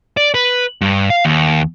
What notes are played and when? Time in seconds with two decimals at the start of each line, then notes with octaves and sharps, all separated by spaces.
0.17 D5
0.34 B4
0.81 G2
1.10 F5
1.25 D#2